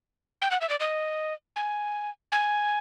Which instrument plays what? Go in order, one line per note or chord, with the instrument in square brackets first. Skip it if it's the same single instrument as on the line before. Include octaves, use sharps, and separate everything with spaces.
[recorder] G5
F#5
E5
D5
D#5
G#5
G#5